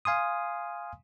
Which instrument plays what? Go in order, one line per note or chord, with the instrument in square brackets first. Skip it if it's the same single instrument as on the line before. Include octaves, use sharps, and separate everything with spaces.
[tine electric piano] F5 G#5 C6 D#6